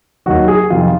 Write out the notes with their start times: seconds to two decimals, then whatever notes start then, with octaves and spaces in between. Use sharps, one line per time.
0.26 D#2 D#3 F#3 F#4
0.48 G#4
0.70 F2 C3 D#3 F4